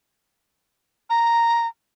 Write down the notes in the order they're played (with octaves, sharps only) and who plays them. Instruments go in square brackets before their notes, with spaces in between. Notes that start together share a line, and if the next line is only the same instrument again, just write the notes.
[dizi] A#5